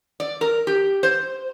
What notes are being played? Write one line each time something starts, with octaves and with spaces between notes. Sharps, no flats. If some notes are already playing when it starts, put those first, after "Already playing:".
D5
A#4
G4
C5